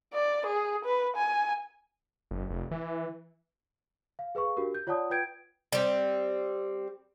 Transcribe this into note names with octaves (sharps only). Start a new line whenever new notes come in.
D5
G#4
B4
G#5
F#1
F1
E3
F5
G#4 B4 F5 C#6
D4 F#4 G4 A#4
G6
F4 C#5 D5 F#5 A5 D#6
F4 B4 G5 G6 G#6 D7
G3 C4